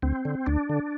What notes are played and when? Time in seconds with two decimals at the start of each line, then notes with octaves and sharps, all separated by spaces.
0.02 D2 C4
0.25 D3
0.46 D2 D4
0.69 D3